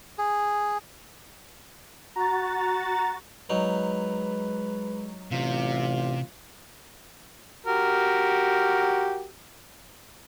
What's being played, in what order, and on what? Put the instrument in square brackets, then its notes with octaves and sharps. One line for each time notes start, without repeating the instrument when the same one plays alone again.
[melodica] G#4
[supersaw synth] F#4 A6 [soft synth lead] A#5
[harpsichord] F#3 D#4 [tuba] G#3 [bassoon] B4
[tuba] A1 [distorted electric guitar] C3 [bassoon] F4
[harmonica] F#4 G4 A#4